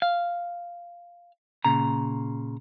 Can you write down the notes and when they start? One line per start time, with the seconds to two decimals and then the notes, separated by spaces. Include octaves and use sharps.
0.02 F5
1.65 A#2 C#3 A#5